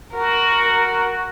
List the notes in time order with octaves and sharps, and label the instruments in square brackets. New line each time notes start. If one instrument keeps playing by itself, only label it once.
[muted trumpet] F#4 [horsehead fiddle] A#4